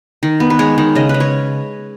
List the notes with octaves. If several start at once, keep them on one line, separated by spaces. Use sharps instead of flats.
D#3
B3
B4
G#3 C#5
D#3
C#3 D#5
B4
C#3
C#5